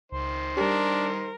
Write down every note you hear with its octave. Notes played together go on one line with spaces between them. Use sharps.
C#2 D#3 C5
G3 D4 G4 A#4